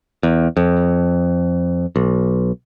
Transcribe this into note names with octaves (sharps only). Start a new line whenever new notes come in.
E2
F2
B1